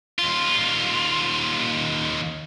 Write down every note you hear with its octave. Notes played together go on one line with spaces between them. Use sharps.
D#2 F4